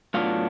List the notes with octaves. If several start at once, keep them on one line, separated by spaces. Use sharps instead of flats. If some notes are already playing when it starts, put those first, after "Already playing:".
A2 F#3 B3 D4 F4 F5